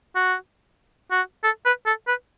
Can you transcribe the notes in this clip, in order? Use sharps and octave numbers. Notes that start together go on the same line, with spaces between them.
F#4
F#4
A4
B4
A4
B4